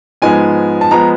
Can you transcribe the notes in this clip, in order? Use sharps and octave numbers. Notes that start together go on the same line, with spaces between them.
G#2 F3 G#3 B3 G#5
A5
F3 G#3 B3 A#5